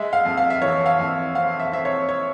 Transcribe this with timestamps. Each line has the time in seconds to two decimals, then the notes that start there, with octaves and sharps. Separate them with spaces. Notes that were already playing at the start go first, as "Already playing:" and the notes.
Already playing: G#3 E5
0.13 F5
0.25 F2
0.37 F5
0.50 E5
0.62 E3 C#5
0.86 F5
0.99 F2
1.35 C4 F5
1.60 E5
1.72 C4 E5
1.85 C#5
2.09 C#5